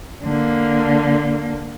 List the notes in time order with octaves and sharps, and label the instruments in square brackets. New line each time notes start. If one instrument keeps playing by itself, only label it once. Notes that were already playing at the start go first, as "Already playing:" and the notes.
[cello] D3 A#3